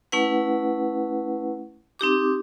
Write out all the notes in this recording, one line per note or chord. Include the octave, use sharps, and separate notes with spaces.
A3 C#4 E4 B4 F#5
C4 D#4 G4 D6